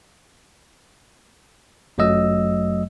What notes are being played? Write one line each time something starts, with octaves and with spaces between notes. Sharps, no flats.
G1 F#2 F#3 A3 D#5 E6